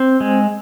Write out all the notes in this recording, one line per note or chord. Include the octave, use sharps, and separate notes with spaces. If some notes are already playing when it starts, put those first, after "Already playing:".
Already playing: C4
G#3